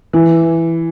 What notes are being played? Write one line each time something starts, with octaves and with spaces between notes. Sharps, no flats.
E3